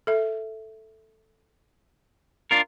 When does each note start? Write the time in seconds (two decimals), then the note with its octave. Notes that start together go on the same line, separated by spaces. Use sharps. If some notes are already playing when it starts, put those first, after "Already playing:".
0.07 A4 E5
2.51 D4 F4 A#4